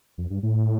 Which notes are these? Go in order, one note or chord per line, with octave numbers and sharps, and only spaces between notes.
F2
G2
A2